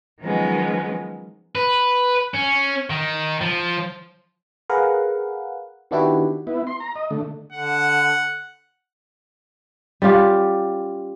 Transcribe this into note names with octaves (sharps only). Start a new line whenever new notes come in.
D#3 F3 F#3 G#3 B3 C#4
B4
C#4
D#3
F3
G#4 A#4 B4 F5 F#5
D#3 B3 D4 E4 F#4 G4
B3 E4
C6
A#5
D#5
D3 A3
D3 F#5
G3 C#4 F4 G4